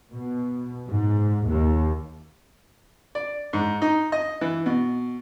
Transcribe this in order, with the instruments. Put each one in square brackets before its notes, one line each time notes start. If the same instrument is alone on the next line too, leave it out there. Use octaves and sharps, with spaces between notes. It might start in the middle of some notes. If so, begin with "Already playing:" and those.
[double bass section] B2
G#2
D#2
[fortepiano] D5
G#2
D#4
D#5
E3
B2